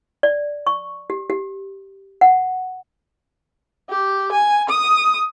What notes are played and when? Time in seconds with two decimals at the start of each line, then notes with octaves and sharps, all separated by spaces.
0.23 D5
0.67 C#6
1.10 G4
1.30 G4
2.21 F#5
3.90 G4
4.32 G#5
4.69 D#6